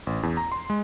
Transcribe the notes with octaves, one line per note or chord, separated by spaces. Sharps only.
A1
E2
A#5
C6
G#3